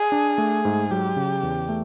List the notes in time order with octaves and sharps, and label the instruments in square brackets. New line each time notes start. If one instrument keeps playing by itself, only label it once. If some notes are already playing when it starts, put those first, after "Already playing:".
Already playing: [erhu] G#4
[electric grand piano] D4
A3
G#2
[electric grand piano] F#3 [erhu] G4
[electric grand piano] C#3
E2
A3